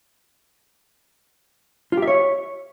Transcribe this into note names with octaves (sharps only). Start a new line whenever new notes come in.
F4
G4
E5
C#5